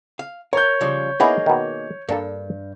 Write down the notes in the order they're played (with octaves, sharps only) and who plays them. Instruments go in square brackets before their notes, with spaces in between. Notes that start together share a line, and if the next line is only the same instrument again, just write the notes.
[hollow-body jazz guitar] F5
[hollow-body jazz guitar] A#4 [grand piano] C#5 G6
[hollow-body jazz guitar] C#3 F3 G3
[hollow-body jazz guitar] A#3 D#4 G#4 [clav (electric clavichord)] B3 C#4 E4
[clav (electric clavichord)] B2 D#3
[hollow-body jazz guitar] G2 [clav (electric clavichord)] A#3 D4 A4